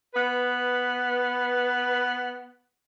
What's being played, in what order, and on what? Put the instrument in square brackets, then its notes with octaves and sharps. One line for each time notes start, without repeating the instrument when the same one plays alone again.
[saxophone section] B3 B4